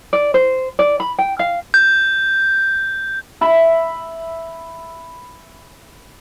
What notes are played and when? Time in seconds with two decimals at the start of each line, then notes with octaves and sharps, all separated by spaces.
0.13 D5
0.34 C5
0.79 D5
1.00 B5
1.19 G5
1.39 F5
1.74 G6
3.41 E5 B5